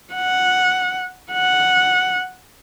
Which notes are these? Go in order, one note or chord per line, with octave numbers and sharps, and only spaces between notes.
F#5
F#5